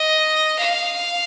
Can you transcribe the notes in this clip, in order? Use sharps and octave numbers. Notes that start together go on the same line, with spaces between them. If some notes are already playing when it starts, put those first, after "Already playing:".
Already playing: D#5
F5